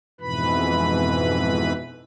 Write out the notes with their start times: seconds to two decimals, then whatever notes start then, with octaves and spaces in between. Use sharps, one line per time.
0.21 F2 G#2 B2 E3 B4 B5